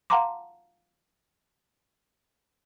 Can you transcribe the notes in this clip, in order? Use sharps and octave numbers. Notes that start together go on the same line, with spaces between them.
F5 F#5 A5 A#5 C6 D6